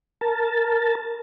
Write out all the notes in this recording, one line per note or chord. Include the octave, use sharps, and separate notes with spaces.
A#4 A5